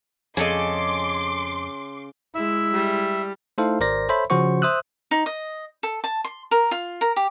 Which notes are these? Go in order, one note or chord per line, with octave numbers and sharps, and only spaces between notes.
F2 C#3 G#4 A4 D#5 C6 D6
G#3 E4 E5
G3
A3 D#4 E4 A4 C5 F5
G#1 A#4 C5 D5 A#6
A4 C5 C#5 E5 B5
C#3 F3 C#4 F#4 C5 C#6
C5 E5 D#6 E6 F#6
D#4
D#5
A4
A5
C6
A#4
F4
A#4
G4